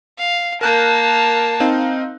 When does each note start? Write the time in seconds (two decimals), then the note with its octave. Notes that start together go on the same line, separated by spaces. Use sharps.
0.18 F5
0.61 A#3 A#4 A5 F#6 G6
1.60 C4 D#4 F5